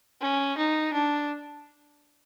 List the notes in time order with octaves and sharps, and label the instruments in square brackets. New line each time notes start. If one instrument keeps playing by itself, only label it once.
[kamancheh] C#4
D#4
D4